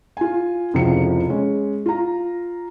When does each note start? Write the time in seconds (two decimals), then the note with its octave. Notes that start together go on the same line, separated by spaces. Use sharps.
0.17 F4 G#5
0.74 F1 C#2 F3 E4 F#4 C#7
1.29 G#3 C#4
1.86 F4 A#5